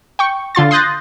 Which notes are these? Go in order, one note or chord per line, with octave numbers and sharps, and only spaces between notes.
G5 C#6
D3 F4 C6 A6
C6 D#6 F#6 G6 A6 A#6